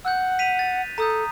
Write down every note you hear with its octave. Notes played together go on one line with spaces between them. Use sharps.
F#5 E6 F#6 G6
B6 D#7 F7
A6 D#7
A4 A#5 D#6 G6